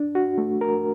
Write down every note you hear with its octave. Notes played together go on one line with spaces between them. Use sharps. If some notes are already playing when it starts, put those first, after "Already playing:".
Already playing: D4
F#4
A3
A#4